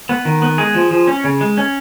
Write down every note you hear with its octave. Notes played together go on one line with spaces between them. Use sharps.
B3
D#3
B3
G#3 G#4
F3
F3
C#4
C#3
G#3
C#4